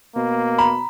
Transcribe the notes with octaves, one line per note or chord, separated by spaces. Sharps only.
B2 A#3
A#5 B5